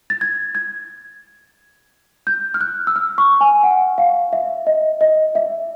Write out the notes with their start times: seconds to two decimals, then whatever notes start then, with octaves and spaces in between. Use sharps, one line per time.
0.10 A6
0.21 G#6
0.55 G#6
2.27 G6
2.54 F6
2.61 F#6
2.87 E6
2.96 F6
3.18 C#6
3.41 G#5
3.63 F#5
3.98 F5
4.33 E5
4.67 D#5
5.01 D#5
5.35 E5